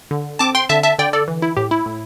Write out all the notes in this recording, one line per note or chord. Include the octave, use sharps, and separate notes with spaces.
D3
C4 A5 D6
G5 C6
D3 E5 A5
E5 A5
D3 D5 G5
A4 D5
E3
E4
A2 G4
E4
A2